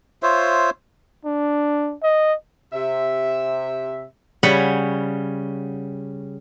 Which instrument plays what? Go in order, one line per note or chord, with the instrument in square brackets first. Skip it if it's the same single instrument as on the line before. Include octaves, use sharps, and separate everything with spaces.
[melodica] F4 C5 C#5 E5
[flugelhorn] D4
D#5
[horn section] C3 E5
[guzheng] C#3 G3 F#4 C#5 F#5 B5